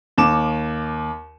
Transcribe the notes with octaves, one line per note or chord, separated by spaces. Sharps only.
D#2 D6 E7